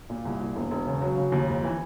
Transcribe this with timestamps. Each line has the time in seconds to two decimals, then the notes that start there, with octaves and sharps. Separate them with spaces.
0.10 A#2
0.25 C2
0.40 A#2
0.56 E1
0.71 E1
0.87 C#3
1.02 F#3
1.18 C#3
1.32 D#2
1.48 F2
1.63 E3